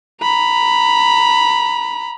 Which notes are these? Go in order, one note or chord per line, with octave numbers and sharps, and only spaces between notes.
A#5 B5